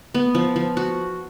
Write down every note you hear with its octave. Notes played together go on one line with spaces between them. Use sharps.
B3
F3
F3
F#4